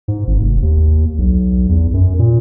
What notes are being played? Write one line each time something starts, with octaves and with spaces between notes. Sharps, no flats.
G#2
G#1
F1
D#2
B1
E2
F#2
A#2